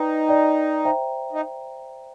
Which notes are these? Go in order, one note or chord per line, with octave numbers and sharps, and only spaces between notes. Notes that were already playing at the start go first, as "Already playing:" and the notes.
Already playing: D#4 B4 D5 G5
B4 D5 G5
C5 E5 G5 A#5
D#4